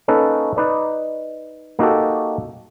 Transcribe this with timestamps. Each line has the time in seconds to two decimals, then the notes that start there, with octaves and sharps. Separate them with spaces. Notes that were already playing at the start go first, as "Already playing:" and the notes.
0.08 A#3 C#4 D#4 A4 B4
0.57 D#4 B4 D5
1.79 A#3 D#4 F#4 G4 A4